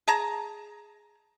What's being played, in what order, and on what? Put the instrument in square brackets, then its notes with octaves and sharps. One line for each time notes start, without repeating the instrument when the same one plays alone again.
[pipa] G#4 A5 A#5